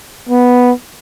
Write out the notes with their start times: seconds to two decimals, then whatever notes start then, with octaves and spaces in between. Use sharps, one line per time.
0.29 B3